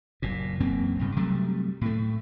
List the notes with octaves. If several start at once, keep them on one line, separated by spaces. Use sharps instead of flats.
F#1 A#2
E1 F#2 A#3 C4
C2 G2 C#3
C3 F#3 G3 A3
A2 A3